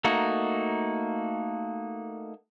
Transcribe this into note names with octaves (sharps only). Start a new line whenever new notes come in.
A3 A#3 D#4 F#4